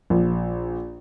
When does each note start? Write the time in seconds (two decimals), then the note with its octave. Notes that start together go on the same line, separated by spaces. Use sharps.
0.10 A#1